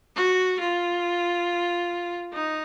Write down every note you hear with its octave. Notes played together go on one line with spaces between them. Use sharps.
F#4
F4
D#4